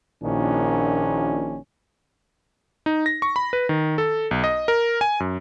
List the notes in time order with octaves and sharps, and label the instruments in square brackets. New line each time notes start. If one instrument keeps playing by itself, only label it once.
[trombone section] A#1 A#2 D#3 C#4 D4 E4
[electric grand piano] D#4
A#6
C#6
B5
B4
D#3
A4
B1
D#5
A#4
G#5
F#2